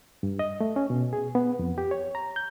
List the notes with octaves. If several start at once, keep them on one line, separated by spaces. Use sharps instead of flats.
G2
D#5
A3
C#4
B2
G#4
B3
F2
G4
C#5
A#5
G6